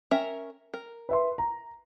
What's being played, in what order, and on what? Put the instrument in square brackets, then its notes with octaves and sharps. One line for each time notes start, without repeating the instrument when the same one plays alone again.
[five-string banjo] C#4 A#4 E5
A#4
[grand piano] B4 E5 C6
A#5